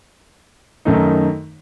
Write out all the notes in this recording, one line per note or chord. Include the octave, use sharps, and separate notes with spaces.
F#2 D#3 A3 D#4